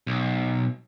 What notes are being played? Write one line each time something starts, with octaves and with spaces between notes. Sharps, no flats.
B1